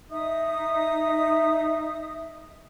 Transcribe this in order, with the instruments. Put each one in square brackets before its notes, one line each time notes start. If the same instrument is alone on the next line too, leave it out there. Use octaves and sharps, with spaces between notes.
[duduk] D#4 [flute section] D#5 E5 D#6